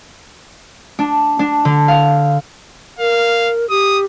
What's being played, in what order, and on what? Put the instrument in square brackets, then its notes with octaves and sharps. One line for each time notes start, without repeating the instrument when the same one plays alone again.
[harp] D4
D4
D3
F5
[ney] A#4 [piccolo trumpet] F5
[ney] G4 [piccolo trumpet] D#6